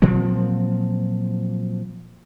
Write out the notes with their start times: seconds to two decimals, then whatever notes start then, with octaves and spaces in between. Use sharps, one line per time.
0.02 A#2 F3 F#3 C4